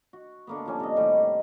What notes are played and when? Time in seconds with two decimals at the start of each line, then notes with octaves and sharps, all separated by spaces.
0.13 F#4
0.47 D3 A#3 B3
0.66 F3 G3 C#4 D4
0.80 C3 D#5
0.96 A2 D#3 G3
1.16 D#3